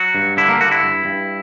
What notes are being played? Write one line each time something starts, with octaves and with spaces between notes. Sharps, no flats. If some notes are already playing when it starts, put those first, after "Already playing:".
Already playing: F#3 F#4
G2
D3 E4
A#3
G2 F#4
E4
G2
G2